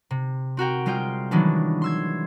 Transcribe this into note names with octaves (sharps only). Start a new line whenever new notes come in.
C3
C4 F#4 A#4 G5
G3 G#3 F4 C5 G5
D#3 E3 F#3 G#3 B3 D4
C6 E6 G#6